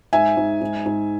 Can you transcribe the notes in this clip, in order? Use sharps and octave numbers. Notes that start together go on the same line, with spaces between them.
G#2 E5 G#5
G#2
G#2
G#2